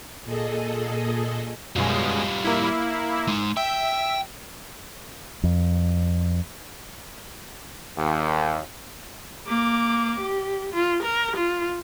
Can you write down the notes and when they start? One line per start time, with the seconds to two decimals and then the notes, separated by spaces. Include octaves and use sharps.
0.24 A#2 G#4 A4 D#5
1.76 F#2 B2 G3 G#3 F4
2.45 A#3 E4
3.28 G#3 D#4
3.57 E5 G5
5.43 F2
7.97 D#2
9.48 A#3 D6
10.21 G4
10.73 F4
11.04 A#4
11.37 F4